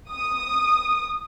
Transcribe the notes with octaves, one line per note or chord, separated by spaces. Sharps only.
D#6